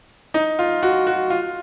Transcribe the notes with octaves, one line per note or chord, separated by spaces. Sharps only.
D#4
F4
F#4
F#4
F4